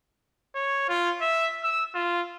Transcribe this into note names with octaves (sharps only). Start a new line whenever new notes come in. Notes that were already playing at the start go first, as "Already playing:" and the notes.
C#5
F4
E5
E6
F4